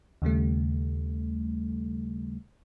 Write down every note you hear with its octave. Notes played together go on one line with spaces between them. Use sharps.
D#2 C#3 G3 A3